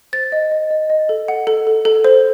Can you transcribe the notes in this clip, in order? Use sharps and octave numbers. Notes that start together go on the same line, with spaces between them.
C5 A6
D#5
D#5
D#5
D#5
A4
F#5
A4
A4
A4
C5